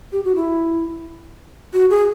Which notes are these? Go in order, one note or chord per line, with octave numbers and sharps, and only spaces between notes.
G4
F#4
E4
F#4
G#4